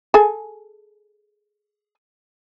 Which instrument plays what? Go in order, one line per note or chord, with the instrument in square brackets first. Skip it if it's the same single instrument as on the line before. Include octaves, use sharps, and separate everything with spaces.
[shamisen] G#4 A4 G#5